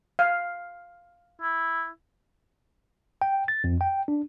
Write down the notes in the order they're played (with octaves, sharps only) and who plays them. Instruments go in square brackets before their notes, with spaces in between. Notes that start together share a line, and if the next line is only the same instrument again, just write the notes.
[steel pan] F5
[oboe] E4
[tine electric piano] G5
A6
F2
G5
D4